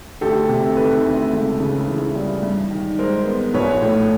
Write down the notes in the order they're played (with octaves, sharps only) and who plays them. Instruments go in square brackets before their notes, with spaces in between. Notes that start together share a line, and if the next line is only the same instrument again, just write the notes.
[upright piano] D2 G4 A4
C3
D#3 A4 B4
D2
C#2
C#3
E3
G3
G2
D#3
G#3 A#4 C5
B3
A#1 B4 C#5
A2